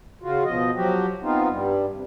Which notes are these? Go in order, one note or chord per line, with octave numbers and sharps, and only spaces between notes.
C#3 F4 F#4
B2 F3 D#5
F3 F#3 F#4 G4
B3 C4 D#4 F4
G2 G3
C3